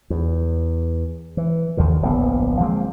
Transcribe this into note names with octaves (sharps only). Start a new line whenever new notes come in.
E2
E3
D#2 D3 D#3
D1 A#1 A#2 B3
F3 G#3 A#3 C4